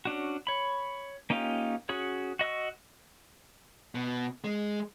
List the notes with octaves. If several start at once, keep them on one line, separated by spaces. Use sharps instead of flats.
C#4 D4 F#4
C#5 B5
A#3 C#4 D#4 F4 G4
C#4 F#4 G#4 C#5
F#4 D#5 C#6 E6
B2
G#3